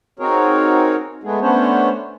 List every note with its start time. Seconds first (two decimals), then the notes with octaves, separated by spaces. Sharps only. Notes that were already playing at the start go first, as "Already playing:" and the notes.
0.19 C4 D#4 F#4 G#4 A#4 C#5
1.24 G#3 A3 B3 G#4
1.41 A3 B3 C#4 D4 C5 C#5